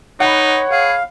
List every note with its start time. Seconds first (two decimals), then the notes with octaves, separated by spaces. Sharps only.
0.20 D#4 C#5 F#5 B5
0.71 G#4 F5